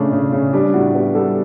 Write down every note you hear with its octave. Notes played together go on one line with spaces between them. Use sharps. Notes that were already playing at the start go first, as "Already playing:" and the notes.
Already playing: C#3 A3 D4
C#3
C#3
G3 D4
A2 F#4
B3 F#4
G3 A4